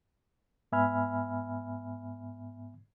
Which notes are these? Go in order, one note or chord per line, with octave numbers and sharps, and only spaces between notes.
G#2 B3 E5 G#5 B5 F6